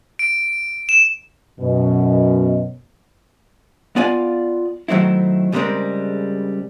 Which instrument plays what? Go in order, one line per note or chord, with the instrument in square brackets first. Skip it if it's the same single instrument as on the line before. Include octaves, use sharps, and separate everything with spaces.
[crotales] D7
E7
[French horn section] F#2 B2
[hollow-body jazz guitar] B3 F4 D5 F5 G#5
D#3 F#3 A3 C4 E4
C#3 G3 G#3 A#3 C4 A#4